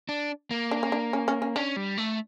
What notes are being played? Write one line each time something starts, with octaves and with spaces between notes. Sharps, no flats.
D4
A#3
D4
C#4
D4
C#4
C#4
C#4
C#4 D4
G3
A3